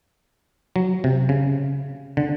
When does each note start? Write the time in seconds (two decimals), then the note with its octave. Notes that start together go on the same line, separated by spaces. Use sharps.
0.76 F#3
1.04 C3
1.29 C#3
2.17 D3